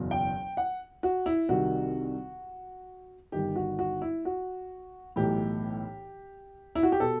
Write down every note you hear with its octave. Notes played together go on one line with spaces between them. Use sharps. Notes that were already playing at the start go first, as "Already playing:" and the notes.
Already playing: F#1 E2 B2
G5
F#5
F#4
E4
C2 C3 D#3 F#4
G1 G2 D#3 G4
F#4
F#4
E4
F#4
B1 A2 E3 G4
E4
F#4
G4
B2 A4